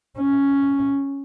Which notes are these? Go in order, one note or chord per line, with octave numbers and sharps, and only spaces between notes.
C#4